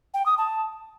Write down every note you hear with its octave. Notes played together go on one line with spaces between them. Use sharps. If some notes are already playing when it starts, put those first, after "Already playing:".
G5
D#6
A5